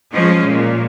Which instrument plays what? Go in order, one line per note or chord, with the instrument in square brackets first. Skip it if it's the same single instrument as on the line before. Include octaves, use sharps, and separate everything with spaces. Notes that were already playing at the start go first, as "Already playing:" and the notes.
[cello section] F3 G#3 C#4
A#2